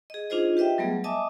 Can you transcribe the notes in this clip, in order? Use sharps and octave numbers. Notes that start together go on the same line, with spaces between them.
G#4 D#5
D4 D#4 F4 G#4 C5 D#5
G4 B4 D#5 E5 G5
F#3 G3 A3 B3 G#4
D#5 E5 G#5 A5 D6 D#6